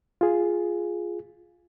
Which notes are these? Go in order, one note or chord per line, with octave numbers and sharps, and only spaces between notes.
F4 G#4